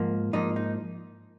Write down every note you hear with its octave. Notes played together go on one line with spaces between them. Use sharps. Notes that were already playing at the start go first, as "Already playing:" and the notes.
Already playing: G#2 F3 A#3
G#2 F3 A#3 D#4
D#4